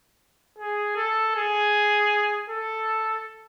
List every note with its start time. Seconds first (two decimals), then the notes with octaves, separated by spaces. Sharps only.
0.58 G#4
0.96 A4
1.35 G#4
2.50 A4